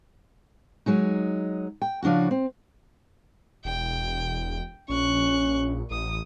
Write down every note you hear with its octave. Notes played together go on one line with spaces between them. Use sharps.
F#3 G#3 D#4
G5
C#3 F3 D4 E4 F#4
C4
E1 G5
A#1 C#4 C#6 F#6
A1 D#6